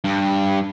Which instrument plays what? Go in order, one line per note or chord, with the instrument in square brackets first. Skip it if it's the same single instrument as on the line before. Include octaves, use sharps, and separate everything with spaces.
[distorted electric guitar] G2